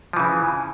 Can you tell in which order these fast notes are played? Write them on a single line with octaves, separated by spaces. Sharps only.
F3 E3 C#3